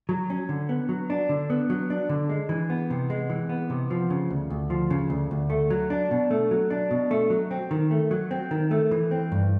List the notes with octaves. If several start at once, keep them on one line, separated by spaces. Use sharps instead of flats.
F#3
C#4
D3
B3
F#3
D4
D3
B3
F#3
D4
D3
G#3
E3
B3
C3
G#3
E3
B3
C3
F3
C#3
D2
D2
F3
C#3
D2
D2
A3
F#3
D4
B2
A3
F#3
D4
B2
A3
F#3
C4
D#3
A3
F#3
C4
D#3
A3
E3
C4
G2